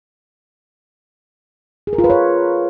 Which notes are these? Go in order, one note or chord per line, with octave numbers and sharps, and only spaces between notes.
G#4
A#4
F4
B4
C#5